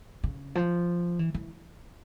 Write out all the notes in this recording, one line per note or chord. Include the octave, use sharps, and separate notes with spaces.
C#3
F3
E3
E3